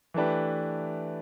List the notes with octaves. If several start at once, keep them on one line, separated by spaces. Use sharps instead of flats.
E3 A3 D4 G4 B4